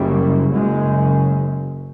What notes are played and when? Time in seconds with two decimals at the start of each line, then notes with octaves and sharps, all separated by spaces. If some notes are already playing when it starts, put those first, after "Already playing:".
Already playing: F#1 F#2 C#3 G3
0.53 F#1 F#2 C#3 G#3